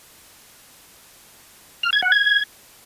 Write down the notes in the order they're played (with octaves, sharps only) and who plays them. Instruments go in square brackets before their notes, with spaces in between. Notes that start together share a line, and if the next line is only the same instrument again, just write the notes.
[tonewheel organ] F6
G#6
F#5
G#6